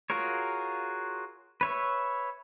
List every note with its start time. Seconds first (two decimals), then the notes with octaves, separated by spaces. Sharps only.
0.10 F4 F#4 G#4 A#4 C#5
1.61 B4 C#5 E5